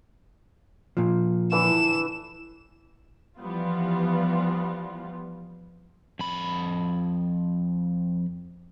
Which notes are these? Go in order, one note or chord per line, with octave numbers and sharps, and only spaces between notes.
A#2 F3
D3 E3 E7
E3 F3 G3 B3 F4
F2 B5